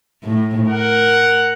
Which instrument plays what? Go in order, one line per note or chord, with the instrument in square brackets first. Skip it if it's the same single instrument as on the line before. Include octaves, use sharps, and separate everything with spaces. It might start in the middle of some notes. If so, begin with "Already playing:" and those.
[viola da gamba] A2
[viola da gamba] A#4 [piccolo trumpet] F#5